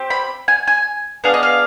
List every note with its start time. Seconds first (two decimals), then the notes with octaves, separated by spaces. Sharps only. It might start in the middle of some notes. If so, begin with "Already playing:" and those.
Already playing: C4 G4
0.10 B5
0.48 G#5
0.67 G#5
1.24 B3 D4 G#4 F5
1.34 D#5
1.43 F5